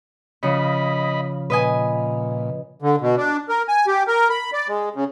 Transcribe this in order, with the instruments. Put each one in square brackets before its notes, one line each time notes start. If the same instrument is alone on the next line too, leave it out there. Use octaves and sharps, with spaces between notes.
[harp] C#3 F3 [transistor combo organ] D#5 B5
[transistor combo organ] A#2 [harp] B4 D#5 G#5
[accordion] D3
B2
D4
A#4
G#5
G4
A#4
B5
D5
G#3
C#3